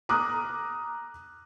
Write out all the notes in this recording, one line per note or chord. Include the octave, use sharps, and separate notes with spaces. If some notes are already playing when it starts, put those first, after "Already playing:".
A#5 D6 D#6 F6 F#6